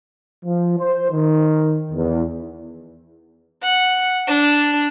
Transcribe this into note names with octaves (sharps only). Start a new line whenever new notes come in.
F3
C5
D#3
E2
F#5
D4